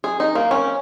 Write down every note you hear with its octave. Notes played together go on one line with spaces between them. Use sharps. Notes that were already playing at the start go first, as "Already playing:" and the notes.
G#4
D#4
A#3
C#4